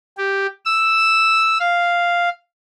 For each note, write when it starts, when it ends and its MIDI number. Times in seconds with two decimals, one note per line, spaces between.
0.18 0.47 67
0.65 1.58 88
1.60 2.29 77